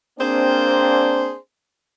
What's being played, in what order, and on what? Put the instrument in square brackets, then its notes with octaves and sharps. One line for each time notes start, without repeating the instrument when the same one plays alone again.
[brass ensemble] A#3 C4 D4 [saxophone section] G#4 C5